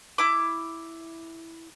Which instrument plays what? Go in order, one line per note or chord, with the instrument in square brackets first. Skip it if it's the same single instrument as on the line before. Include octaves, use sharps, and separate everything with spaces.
[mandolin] E4 D6